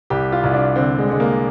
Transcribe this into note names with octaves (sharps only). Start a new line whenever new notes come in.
C2 G4
F4
C2
D4
D3 C4
G#3
D3 G#3
A#3